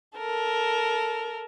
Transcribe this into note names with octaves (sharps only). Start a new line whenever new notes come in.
A4 A#4